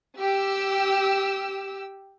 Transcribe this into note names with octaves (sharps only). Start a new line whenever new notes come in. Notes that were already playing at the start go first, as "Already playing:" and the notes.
G4 E6